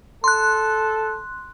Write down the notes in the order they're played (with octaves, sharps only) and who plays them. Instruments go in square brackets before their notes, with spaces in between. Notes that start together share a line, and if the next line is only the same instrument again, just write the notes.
[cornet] A4 [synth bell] C6 F#6